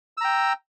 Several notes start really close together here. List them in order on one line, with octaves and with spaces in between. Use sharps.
E6 A#5 G5